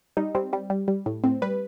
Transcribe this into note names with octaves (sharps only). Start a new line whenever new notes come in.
G3 D#4
G3 C4
G3
G3
G3
A2
A2 C4
G3 B4